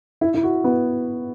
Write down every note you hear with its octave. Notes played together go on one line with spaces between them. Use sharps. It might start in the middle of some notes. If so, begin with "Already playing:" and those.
E4
E4
F#4
B3